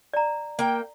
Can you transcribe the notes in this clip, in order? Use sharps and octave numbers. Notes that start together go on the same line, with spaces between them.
D5 A#5
A#3 G5